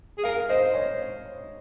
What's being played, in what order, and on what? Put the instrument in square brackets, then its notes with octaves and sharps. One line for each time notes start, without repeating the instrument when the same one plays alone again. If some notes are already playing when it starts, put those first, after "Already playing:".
[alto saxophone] G#4
[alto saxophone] A#4 [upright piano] F5
[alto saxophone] C5 [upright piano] D#5
[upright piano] C#5